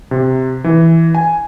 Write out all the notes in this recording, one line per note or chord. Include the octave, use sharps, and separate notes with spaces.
C3
E3
G#5